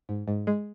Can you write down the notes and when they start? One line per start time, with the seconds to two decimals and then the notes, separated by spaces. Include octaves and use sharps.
0.09 G#2
0.28 G#2
0.47 G#3